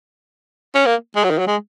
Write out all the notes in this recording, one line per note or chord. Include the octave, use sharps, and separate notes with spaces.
C#4
A#3
G#3
F#3
D#3
F#3
G#3